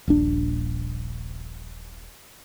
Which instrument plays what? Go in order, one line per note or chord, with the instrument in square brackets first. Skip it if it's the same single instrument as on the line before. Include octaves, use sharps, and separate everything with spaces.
[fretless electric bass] D#1 A#1 D4